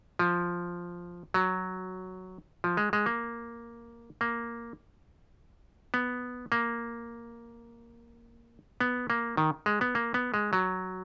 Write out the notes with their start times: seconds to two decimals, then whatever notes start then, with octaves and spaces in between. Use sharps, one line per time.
0.19 F3
1.34 F#3
2.64 F3
2.77 G#3
2.93 G#3
3.06 A#3
4.21 A#3
5.94 B3
6.52 A#3
8.80 B3
9.10 A#3
9.37 D#3
9.66 G#3
9.81 B3
9.95 A#3
10.14 B3
10.34 G#3
10.53 F#3